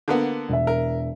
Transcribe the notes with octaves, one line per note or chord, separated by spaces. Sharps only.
D3 A#3 B3
E1 E5
A#4